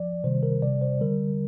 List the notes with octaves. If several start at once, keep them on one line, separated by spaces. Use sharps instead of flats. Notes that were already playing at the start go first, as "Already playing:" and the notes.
Already playing: F3 D5
C3 D#3 G3 C5
A#4
C3 G3 D5
C5
D3 G3 A#4